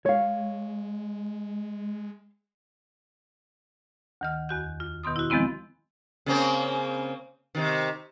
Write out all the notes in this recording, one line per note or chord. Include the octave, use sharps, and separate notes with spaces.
G#3 C#5 F5
D2 D#3 F6
E2 F#4 G6
F4
B2 D#3 B3 C6 D#6
E4 F#4
D#3 F3 G#3 B3 C4 E4
C#3 A#3 C4
C3 D#3